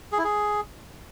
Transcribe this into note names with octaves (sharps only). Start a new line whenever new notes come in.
G#4
E4
G#4